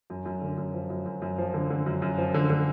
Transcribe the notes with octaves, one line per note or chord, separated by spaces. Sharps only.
F#2
F#2
D3
F#2
F3
F#2
F#2
F#2
F3
D3
D3
F#2
F#2
F3
D3
D3